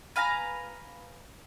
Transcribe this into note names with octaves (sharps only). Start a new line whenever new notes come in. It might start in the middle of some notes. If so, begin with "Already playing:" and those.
B4 F5 G#5 A#5